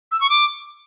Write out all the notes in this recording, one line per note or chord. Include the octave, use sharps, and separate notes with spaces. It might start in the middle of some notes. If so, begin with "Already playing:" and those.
E6
C#6
D6